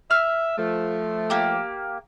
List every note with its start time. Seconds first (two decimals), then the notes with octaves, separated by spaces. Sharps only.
0.11 E5 F6
0.58 F3 A3
1.30 A#3 G4